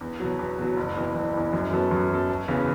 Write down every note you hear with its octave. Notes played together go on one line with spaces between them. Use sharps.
E2
B2 F#3
E2
B2 F#3
F#1
E2 E3
F#1
E2 E3
F#2
F#3 B3 A4
F#2
F#3 B3 A4
E1
E2 C#3 E3 B3